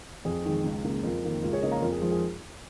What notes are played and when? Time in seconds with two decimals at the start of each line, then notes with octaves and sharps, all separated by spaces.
0.25 F2 G#4
0.45 D#3 G#3
0.64 C#2
0.84 C#3 A#3
1.03 F2 F4 A#4
1.23 D#3 A#3
1.42 C#2 F4 A#4
1.52 G#4 C#5
1.62 C#3 A#3 A#4 D#5
1.71 F5 A#5
1.81 F2 F4 A#4
1.91 G#4
2.01 F3 G#3 F4
2.11 G#4